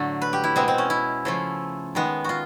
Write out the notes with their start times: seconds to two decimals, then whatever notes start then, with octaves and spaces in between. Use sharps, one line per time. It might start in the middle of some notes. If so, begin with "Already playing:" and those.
Already playing: A2 D3 F#3 A3
0.22 B4
0.33 G4
0.44 E4
0.56 B2 G#3 B3 C4
0.68 C4
0.78 C#4
0.90 E4
1.25 C#3 F3 A3
1.95 D#3 G#3 B3
2.24 F4 F#4